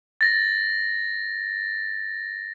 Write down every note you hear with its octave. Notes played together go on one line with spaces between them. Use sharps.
A6 A#6